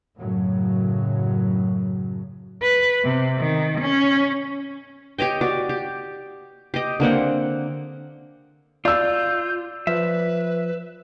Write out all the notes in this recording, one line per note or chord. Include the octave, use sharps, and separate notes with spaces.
F#2 A2 C#3 F#3
B4
C3
D#3
C#4
G4 C#5 D#5 G5
F#4 D5
G4
G4 D#5
D3 A#3 C4 F#5
F4 D5 E6 G6
F3 B4 E5